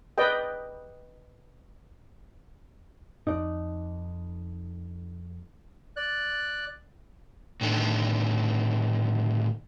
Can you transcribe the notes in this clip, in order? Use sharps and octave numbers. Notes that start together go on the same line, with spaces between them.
B4 D5 D#5 G5
F2 D#4 D5
D5 F#6
A2 D3 D#3